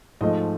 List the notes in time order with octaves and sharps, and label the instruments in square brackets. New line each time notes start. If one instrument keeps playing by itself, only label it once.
[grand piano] G#2 F3 A3 D#5